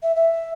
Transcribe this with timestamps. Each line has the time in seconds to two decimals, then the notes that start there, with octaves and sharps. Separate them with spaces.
0.03 E5
0.16 E5